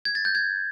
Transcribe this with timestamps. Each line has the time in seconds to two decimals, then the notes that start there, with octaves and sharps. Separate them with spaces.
0.05 G#6
0.15 A6
0.25 G6
0.35 G#6